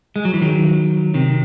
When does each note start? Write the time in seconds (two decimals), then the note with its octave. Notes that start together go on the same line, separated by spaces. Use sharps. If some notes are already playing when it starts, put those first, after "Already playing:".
0.16 G#3
0.25 F#3
0.34 E3
0.42 D#3 F#3
1.14 C3 D#3